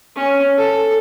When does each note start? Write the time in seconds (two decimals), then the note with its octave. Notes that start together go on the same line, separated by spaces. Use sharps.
0.16 C#4
0.58 A4